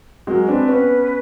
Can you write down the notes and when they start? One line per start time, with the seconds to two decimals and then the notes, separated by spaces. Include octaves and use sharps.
0.27 F#3 G#3 A#4
0.48 C4 D4 B4
0.69 B3 C#4 B4